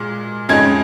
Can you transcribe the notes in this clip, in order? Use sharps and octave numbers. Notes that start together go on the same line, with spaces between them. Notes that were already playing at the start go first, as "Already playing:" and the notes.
Already playing: A#2 G#3 F6
F2 C#3 G#3 D#4 G#6